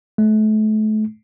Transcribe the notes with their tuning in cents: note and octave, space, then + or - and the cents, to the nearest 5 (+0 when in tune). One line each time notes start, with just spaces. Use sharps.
A3 -35